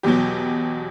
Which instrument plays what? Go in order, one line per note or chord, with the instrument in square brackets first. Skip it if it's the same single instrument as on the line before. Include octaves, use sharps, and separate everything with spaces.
[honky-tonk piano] E2 B2 F#3 G4